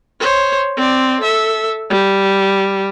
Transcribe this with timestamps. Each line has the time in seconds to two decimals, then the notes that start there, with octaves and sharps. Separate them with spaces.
0.20 C5 C#5
0.77 C4 D5
1.20 A4 E5
1.90 G3